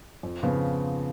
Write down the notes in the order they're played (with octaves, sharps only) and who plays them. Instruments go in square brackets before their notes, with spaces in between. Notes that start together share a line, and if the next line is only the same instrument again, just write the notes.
[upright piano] F2
C#3 F3 B3 F4